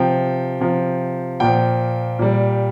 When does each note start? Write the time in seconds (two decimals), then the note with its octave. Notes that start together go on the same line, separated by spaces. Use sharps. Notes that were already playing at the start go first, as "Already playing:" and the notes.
Already playing: C3 F3 G5
0.61 C3 F3
1.40 A#2 F3 G5
2.19 A#2 G3